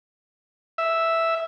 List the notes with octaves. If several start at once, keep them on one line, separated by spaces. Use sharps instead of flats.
E5